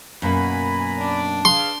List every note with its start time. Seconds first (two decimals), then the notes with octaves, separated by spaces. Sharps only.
0.22 F#2 B2 A#3 G#5 A#5 B5
0.98 D4 D5
1.45 G#4 B4 F5 C6